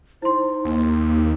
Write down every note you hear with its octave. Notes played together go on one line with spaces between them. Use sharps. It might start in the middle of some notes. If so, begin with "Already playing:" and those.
D#4 E4 C5 C6
D#2 A#3